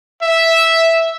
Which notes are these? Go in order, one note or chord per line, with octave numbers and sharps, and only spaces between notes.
E5